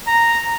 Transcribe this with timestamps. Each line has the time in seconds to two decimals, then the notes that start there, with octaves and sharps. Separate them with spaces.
0.07 A#5